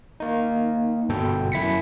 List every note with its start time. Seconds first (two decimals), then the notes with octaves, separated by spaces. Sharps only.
0.20 A#3 D#4
1.09 G1 B2 A4 G5
1.52 F#2 E4 B6 C#7